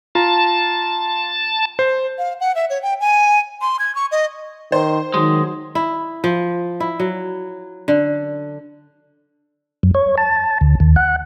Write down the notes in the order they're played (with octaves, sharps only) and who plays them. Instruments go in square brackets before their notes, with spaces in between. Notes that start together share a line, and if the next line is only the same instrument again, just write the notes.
[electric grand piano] F4 A#5 [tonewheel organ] A5
[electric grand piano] C5
[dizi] F5
F#5
E5
C#5
G5
G#5
C6
G#6
C#6
D#5
[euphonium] D#3 [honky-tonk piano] C5
[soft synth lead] D#3 [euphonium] F#3 [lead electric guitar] G#3
[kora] E4
F3
E4
F#3
D3
[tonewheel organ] F#2
C#5
A5
D2
D#2
F#5